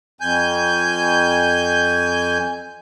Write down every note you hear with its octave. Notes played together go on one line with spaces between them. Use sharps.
F2 G#5 G6